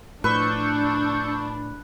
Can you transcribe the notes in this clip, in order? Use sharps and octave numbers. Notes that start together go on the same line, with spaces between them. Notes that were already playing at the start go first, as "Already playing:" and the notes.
A2 F3 D4 B4 C#6 E6 G6